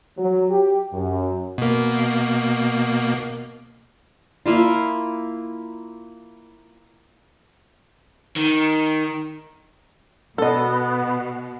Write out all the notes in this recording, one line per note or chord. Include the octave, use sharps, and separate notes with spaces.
F#3
G4
F#2
B2 A#3
A#3 E4 F4
D#3
B2 B3 A4 D#5